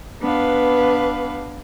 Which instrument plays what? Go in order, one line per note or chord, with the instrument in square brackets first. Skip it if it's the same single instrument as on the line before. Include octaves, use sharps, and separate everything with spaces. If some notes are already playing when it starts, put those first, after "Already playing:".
[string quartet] B3 D4 B4 F5